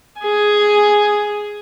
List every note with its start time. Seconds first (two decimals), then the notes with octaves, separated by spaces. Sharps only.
0.21 G#4 G#5